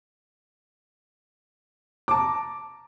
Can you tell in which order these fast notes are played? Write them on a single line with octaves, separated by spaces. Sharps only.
D6 A5 A#5